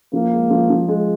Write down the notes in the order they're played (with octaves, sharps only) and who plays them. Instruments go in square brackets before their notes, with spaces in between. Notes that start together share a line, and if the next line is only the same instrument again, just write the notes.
[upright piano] F3 [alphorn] A#3
[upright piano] G#3
F3
F3
G#3